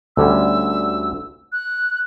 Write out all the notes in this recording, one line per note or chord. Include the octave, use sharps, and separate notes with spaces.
D2 D3 G3 C#4 E6
F#6